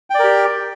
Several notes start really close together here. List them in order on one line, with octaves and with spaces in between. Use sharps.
G5 D5 A#4 G4